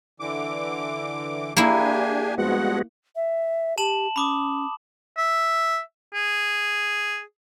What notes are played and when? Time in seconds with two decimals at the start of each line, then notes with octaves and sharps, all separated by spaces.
0.20 D3 E3 D6
1.57 A#3 D4 E4 G4 G#4 G#5
2.38 G2 F3 G#3 B3 F#4 F#5
3.16 E5
3.78 G4 A5 E7 F#7
4.16 C#4 B5 D6 D#6
5.18 E5
6.14 G#4